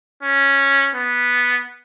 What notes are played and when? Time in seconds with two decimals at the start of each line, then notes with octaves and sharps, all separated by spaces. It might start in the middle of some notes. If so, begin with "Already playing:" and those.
0.23 C#4
0.95 B3